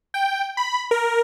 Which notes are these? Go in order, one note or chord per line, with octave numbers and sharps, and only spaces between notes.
G5
B5
A#4